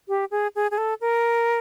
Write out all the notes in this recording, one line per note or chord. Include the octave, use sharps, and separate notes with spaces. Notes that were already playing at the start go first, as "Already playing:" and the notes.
G4
G#4
G#4
G#4
A4
A#4